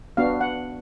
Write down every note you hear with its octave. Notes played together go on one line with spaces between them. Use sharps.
B3 D4 F#4 F5
F#5